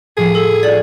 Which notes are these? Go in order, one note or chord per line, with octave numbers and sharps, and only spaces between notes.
A2 F3 G3 G#4
A4
F4 F#4 D5 F#7